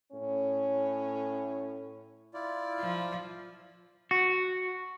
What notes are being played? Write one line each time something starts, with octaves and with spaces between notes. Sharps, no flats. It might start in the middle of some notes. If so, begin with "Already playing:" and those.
A2 C#4
E4 F4 D5
F3
F#4